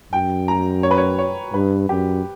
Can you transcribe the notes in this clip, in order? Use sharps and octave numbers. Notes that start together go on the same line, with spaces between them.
F#2 G5
A#5
C#5
B4
C#5
C#5
G2 B4
F#2 G4